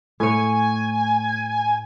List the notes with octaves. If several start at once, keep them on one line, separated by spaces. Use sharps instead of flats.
A2 C#5 G#5